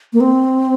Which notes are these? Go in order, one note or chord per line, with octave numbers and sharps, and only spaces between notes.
A#3
C4